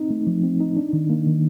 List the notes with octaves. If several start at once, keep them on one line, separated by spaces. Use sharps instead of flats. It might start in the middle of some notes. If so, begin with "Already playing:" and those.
Already playing: C4 D#4
A3
F3
C4
D#4
D4
D#3
A#3
D#3